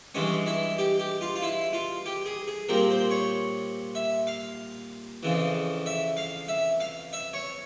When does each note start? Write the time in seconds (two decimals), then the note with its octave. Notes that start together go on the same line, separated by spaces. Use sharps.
0.15 G2 E3 G#3 C#4
0.46 E4
0.78 G4
0.99 G4
1.21 F4
1.35 F4
1.42 E4
1.73 F4
2.06 G4
2.26 G#4
2.48 G#4
2.69 A#2 G3 C4 A#4
2.90 C5
3.11 C#5
3.95 E5
4.27 F5
5.23 F2 C#3 E3
5.86 E5
6.17 F5
6.48 E5
6.80 F5
7.13 E5
7.33 C#5